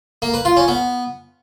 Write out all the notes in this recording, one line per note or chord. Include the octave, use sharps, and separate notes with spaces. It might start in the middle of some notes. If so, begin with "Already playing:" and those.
A#3
B4
F4
C#4
B3